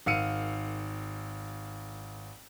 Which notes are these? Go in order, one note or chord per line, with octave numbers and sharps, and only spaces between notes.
G#1 F5 E6 C#7 D#7